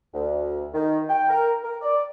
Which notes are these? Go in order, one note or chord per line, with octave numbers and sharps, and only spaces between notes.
D2
D#3
G5
A#4
A#4
D5